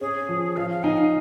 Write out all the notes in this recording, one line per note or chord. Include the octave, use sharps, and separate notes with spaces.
C#4 G#4
F3
F3 F5
F5
D#4 G#5
F5